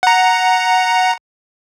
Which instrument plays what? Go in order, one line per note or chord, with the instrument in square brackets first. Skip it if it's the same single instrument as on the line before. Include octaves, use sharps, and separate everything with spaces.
[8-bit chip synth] F#5 A#5